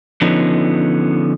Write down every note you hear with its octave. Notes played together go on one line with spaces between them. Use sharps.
D3 F3 B3 C#4 D#4